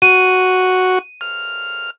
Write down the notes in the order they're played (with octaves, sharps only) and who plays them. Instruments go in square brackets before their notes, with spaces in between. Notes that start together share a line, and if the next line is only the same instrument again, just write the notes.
[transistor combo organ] F#4 [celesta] D#7
[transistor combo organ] F6